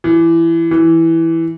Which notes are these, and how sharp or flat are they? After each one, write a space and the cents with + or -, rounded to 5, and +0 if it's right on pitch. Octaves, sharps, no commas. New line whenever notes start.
E3 +15
E3 -5